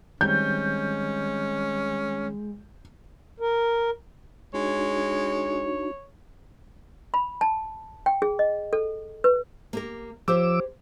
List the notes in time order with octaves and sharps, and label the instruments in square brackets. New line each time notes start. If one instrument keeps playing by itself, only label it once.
[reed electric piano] D#3 G3 C4 [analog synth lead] G#3 [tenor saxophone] C#4 [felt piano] G6
[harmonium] A#4
[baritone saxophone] G#3 [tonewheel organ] D4 D#4 F#4 [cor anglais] C#5
[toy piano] B5
A5
G5
G#4
D#5
A4
B4
[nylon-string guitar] A#3 G4 A#4
[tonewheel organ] F3 D6 E6 [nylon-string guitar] G4 C5 C#5